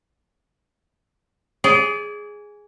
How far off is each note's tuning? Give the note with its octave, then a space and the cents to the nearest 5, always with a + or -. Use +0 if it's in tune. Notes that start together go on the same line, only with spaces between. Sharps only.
G#4 +0 D5 -35